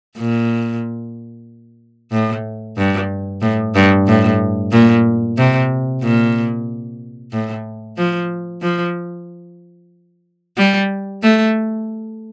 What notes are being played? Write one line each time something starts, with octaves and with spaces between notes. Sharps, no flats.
A#2
A2
G2
A2
G2
A2
A#2
C3
A#2
A2
F3
F3
G3
A3